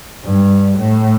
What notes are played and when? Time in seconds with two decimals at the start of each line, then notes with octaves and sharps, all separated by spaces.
0.24 G2
0.78 A2